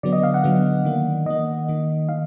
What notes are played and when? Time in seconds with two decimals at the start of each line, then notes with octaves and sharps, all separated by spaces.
0.03 D3 F#3 B3 D5
0.13 D#5
0.23 F5
0.34 F#5
0.44 D3 F#3 B3
0.85 D#3 A#3
1.26 D#3 A#3 D#5
1.68 D#3 A#3
2.08 D#3 F5